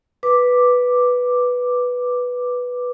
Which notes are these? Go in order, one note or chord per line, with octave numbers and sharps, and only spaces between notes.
B4 D6